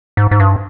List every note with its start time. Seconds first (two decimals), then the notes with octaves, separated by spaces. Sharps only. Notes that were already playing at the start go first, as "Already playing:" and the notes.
0.17 G#2
0.31 G#2
0.40 G2